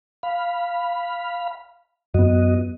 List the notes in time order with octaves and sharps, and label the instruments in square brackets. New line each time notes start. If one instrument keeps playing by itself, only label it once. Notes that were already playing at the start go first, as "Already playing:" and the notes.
[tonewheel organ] F5 B5
[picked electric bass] F#2 B3 [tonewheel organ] F#4 D#5